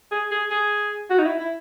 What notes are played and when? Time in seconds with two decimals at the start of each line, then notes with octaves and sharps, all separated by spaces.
0.12 G#4
0.31 G#4
0.50 G#4
1.10 F#4
1.19 D#4
1.25 E4
1.39 E4